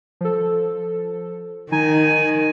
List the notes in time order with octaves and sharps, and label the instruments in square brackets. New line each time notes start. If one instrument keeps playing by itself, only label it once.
[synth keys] F3 A4
[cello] D#3 [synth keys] D#4 [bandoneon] G#5